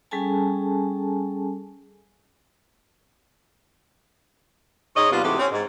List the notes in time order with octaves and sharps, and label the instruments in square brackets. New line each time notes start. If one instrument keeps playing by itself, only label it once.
[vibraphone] G3 C#4 G#4 A4 G#5 A5
[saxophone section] G#2 C#5 D#5
C3 G3 B3 D4 F4
G#2 C3 E3 A3 F#4 G4
C4 C#4
G#2